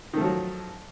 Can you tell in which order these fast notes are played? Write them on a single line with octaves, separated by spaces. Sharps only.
D#3 A3 F3 F#3